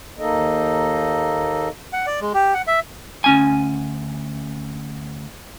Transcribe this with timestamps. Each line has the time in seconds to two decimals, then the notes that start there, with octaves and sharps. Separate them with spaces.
0.19 D#2 A#3 D#4 A4 D#5
1.93 F#5
2.06 D5
2.21 G#3
2.34 G4
2.54 F#5
2.67 E5
3.24 D2 C#4 G#5